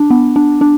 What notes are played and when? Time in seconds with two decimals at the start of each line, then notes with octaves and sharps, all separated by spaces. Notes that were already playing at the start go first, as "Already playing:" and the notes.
Already playing: D4
0.10 B3
0.36 D4
0.61 D4